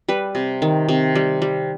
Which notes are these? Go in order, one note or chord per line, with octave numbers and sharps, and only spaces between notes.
G3 B4
C3
D#3
C3
G3
G3